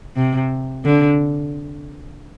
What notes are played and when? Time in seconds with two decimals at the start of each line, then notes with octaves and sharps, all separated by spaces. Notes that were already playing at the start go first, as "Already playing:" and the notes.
0.16 C3
0.85 D3